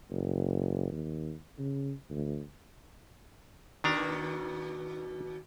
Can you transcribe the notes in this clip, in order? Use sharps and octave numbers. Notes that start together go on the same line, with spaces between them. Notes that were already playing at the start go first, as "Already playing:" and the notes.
F#1
D#2
C#3
D2
D#2 B2 D#3 D4 F#4 A#5